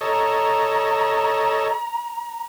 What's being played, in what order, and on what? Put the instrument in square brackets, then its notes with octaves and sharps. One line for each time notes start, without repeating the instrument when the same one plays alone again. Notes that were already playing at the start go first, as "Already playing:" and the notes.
[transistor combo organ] A4 C#5 D#5 [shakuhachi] A#5